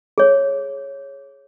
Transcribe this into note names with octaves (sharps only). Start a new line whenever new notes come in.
G#4 C#5